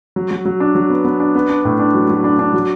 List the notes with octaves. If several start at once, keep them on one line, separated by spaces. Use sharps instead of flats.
F#3
F#3
F#3
D4
F#3
B3
B3
D4
B3
D4
A2
D4
F#3
F#3
D4
D4
F#3